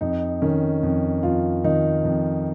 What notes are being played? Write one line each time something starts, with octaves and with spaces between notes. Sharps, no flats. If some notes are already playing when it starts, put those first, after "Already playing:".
F2 D#4
D#3 C#4
F2
F2 F4
D#3 D#4
F2